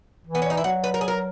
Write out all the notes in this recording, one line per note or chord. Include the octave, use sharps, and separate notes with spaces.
E3
B3
C#4
D#4
E4
F#3 F#4
B4
A#4
G#4
A#4